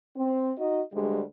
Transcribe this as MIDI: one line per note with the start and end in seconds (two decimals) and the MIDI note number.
0.16 0.50 60
0.58 0.82 63
0.58 0.82 66
0.58 0.82 75
0.93 1.21 38
0.93 1.21 43
0.93 1.21 55
0.93 1.21 56